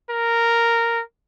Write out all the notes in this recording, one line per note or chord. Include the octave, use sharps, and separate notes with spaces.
A#4